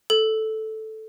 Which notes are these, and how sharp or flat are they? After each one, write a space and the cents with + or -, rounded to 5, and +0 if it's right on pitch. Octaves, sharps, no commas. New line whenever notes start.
A4 -5